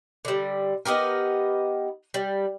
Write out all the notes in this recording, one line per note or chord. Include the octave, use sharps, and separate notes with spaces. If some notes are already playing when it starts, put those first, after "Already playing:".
D3 G3
B3 D#4 G4 A#4
G3